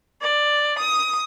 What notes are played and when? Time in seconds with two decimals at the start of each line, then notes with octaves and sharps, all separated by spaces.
0.21 D5
0.79 D#6